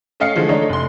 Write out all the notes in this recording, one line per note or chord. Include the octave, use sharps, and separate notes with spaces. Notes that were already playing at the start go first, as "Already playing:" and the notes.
A3 C#4 D#5 F5 C7 C#7
D3 E3 F3 G#3 A3
A3 D4 D#4 C#5 D#5
F1 C6